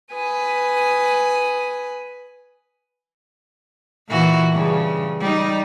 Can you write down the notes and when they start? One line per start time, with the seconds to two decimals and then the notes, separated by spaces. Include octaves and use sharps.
0.14 B4 G#5 D#6
4.08 A#2 E3 F#4
4.52 G2 C#3
5.20 G3 D#4